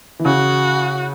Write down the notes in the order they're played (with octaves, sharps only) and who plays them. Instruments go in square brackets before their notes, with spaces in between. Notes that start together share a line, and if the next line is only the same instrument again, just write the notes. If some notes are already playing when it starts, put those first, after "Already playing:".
[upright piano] E3
[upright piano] C#3 [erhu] F#4